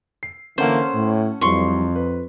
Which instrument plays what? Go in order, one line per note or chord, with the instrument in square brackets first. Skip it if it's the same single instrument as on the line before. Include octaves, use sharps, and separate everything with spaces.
[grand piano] C7
[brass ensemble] D3 E3 A#3 [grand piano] C#4 A4 F#5 [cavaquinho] C5
[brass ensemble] A2
[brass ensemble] F2 [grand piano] E3 F#3 G3 [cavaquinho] C6 C#6
[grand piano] B4